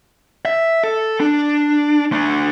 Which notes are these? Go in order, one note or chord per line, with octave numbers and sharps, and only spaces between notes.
E5
A4
D4
A3 D4